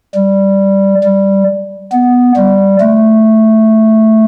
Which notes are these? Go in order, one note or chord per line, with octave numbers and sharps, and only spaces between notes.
G3
G3
B3
G3
A3